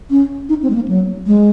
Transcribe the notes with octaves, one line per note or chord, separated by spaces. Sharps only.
C#4
D#4
C4
G#3
A#3
F#3
G#3